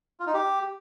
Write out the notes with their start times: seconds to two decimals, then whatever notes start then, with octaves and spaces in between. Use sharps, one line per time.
0.20 F4
0.27 D#4
0.34 G4